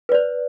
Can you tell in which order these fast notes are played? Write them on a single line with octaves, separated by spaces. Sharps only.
B4 D5 C5